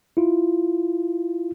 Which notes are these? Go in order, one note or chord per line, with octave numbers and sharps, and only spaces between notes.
E4 F4